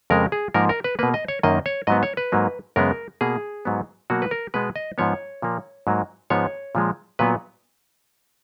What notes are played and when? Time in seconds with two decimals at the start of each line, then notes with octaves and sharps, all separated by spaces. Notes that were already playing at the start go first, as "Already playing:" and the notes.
0.10 F2 C#3 G#3 A#4
0.32 G#4
0.54 G#2 F3 A#3 A#4
0.69 A#4
0.84 B4
0.99 B2 A#3 B4
1.14 D#5
1.28 C#5
1.43 F#2 D#3 A#3 D#5
1.66 C#5
1.87 G#2 F#3 B3 D#5
2.03 C#5
2.17 B4
2.32 G#2 F#3 A#3
2.76 F#2 C#3 G#3 B3 A#4
3.21 B2 A#3 G#4
3.65 G#2 F#3 B3
4.10 B2 F#3 A#3 F#4
4.22 B4
4.31 A#4
4.54 B2 G#3 B3 B4
4.76 D#5
4.98 G#2 F3 B3 C#5
5.42 A#2 F3 A#3
5.87 G#2 F#3 A#3
6.30 G#2 F3 G#3 B3 C#5
6.75 A#2 F3 G#3
7.19 A#2 F#3 B3 B4